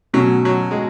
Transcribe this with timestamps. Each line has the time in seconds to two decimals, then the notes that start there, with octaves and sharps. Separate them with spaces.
0.13 B2 F#3 A3 C#4
0.45 F#3
0.71 G#3